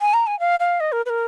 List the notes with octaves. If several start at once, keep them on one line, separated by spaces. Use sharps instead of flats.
G#5
A#5
G#5
F5
F5
D#5
A#4
B4
A#4